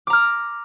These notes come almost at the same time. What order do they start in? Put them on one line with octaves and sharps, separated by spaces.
D6 A#5 F6